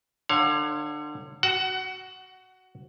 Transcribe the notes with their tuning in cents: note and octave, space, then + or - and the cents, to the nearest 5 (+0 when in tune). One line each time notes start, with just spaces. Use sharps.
D3 +30 C#5 +0 F5 +30
F#4 +10 F#5 +25